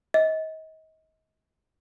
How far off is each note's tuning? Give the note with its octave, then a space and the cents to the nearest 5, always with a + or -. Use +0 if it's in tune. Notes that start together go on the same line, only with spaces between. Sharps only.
D#5 +35